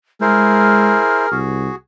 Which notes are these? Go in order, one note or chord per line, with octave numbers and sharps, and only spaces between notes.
G#3 E4 G#4 A#4 C5 F6
C2 F#4 G#4